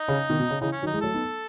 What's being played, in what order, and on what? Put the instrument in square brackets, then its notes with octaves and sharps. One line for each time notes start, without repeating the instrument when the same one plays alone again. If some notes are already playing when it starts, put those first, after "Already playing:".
Already playing: [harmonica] D#4
[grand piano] C#3
B2 D#3
B2
C#3
[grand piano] C#3 E3 [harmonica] D#4
[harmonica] C#4
[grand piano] D#3 F#3
[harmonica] D#4
[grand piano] E3 G#3
[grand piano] F#3 A3 [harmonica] A4
[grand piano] B3 D#4